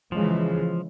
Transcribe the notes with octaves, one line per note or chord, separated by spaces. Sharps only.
C#3 E3 F3 G#3